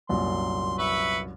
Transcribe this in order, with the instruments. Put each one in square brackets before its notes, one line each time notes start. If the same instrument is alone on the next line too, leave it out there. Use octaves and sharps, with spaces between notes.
[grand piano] C2 F#2 A#2 [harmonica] C6
[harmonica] B4 E5 C#6